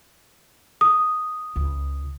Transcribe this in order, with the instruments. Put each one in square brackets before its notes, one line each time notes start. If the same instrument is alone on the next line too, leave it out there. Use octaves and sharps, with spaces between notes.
[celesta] D#6
[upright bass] C#2